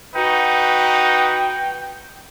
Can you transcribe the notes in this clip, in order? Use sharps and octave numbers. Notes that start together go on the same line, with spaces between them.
D#4 F#4 B4 G5